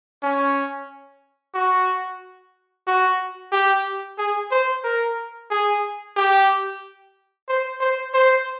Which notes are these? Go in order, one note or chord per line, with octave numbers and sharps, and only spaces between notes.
C#4
F#4
F#4
G4
G#4
C5
A#4
G#4
G4
C5
C5
C5